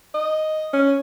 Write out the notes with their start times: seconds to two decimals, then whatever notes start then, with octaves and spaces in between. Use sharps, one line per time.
0.14 D#5
0.73 C#4